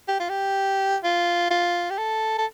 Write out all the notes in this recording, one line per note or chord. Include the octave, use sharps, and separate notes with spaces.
G4
F4
G4
F4
F4
G4
A4
A4